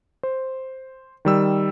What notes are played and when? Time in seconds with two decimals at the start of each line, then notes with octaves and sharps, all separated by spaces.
0.23 C5
1.25 D#3 G3 E6